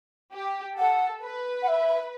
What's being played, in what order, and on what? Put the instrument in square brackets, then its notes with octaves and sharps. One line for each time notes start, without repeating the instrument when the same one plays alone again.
[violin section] G4
[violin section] A4 [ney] F#5
[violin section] B4
[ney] F#5
E5